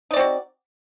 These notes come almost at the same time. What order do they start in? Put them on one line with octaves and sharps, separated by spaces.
D#4 D5 C4 F#4